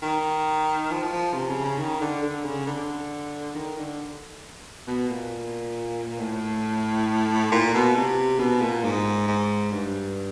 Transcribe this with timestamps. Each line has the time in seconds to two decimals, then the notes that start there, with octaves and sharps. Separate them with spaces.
0.02 D#3
0.91 F3
1.13 F3
1.34 C3
1.50 C#3
1.64 C#3
1.78 D#3
2.01 D3
2.23 D3
2.45 C#3
2.67 D3
3.55 D#3
3.77 D3
4.87 B2
5.10 A#2
6.19 A2
7.52 A#2
7.74 B2
7.96 C3
8.39 B2
8.62 A#2
8.84 G#2
9.27 G#2
9.72 G2